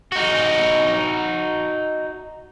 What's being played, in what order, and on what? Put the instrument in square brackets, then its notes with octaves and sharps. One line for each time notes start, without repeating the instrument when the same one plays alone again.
[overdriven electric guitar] D#4 F#4